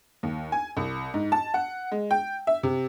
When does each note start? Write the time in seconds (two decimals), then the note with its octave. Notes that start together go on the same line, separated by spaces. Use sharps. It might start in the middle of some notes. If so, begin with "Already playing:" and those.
0.23 D#2
0.52 G#5
0.77 C2
1.14 G#2
1.32 A5
1.54 F#5
1.92 G#3
2.11 G5
2.47 E5
2.63 C3